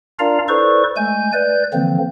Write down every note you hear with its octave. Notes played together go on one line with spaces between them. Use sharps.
D4 F4 A#4 D5 F5 A#5
E4 A4 B4 C5 D5 C#6
G#3 A3 G#5 G6
B4 D5 G6
D3 E3 F3 A#3 C4